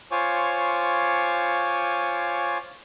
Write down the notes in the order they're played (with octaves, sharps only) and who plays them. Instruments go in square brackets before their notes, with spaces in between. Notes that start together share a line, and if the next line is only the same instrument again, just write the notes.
[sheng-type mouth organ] F4 C5 C#5 G#5 C#6 D6